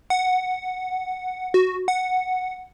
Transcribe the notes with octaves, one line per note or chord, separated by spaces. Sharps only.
F#5
F#4
F#5